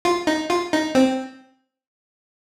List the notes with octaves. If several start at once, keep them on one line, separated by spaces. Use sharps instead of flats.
F4
D#4
F4
D#4
C4